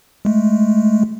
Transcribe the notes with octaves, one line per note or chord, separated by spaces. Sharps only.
G#3 A3